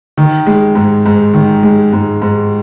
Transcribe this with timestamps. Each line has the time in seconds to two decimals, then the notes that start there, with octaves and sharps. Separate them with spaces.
0.18 D#3
0.46 G#3
0.75 G#2
1.06 G#2
1.34 D#3
1.63 G#3
1.93 G#2
2.22 G#2